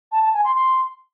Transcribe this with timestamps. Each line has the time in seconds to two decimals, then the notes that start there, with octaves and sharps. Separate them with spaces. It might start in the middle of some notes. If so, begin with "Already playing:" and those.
0.12 A5
0.23 A5
0.33 G#5
0.44 C6
0.55 C6